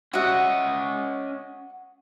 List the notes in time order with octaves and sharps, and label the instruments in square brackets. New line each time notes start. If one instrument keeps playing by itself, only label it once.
[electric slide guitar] C#4 D#5 [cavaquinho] F#4 E5 F#5